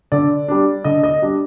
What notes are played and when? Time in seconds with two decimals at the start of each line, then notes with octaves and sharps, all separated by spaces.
0.12 D3 D5
0.48 G3 D4
0.84 D3 D#5
1.03 D#5
1.22 G3 D4